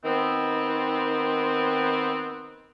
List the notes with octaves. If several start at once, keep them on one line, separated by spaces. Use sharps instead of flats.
D#3 B3 C4